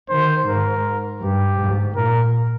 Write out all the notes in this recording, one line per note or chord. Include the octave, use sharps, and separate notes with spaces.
D#3 C5
G#2 A#4
G2 G4
G#2
A#2 A#4